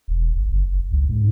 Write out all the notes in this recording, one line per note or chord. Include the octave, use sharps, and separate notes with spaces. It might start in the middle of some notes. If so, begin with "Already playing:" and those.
E1
G1
F#1
C#2
G#2